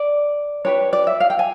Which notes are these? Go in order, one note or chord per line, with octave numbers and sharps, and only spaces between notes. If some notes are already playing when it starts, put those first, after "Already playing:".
Already playing: D5
D4 G4 B4 C#5
D5
E5
F5
G5
G#5